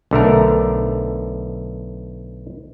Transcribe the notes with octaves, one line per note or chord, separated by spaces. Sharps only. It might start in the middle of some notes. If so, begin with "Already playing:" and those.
B1 D3 A3 A#4